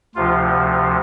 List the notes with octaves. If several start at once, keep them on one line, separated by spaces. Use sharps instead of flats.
D2 C3 F3 F4